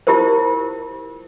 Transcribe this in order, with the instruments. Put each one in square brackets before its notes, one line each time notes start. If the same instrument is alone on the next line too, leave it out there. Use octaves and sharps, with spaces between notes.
[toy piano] E4 F4 G4 A#4 C5